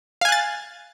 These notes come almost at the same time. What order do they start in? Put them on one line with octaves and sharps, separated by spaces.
F5 G#5 F#6 A6